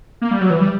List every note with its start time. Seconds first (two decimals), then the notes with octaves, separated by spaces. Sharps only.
0.22 A#3
0.31 G3
0.41 F#3
0.50 E3
0.61 G3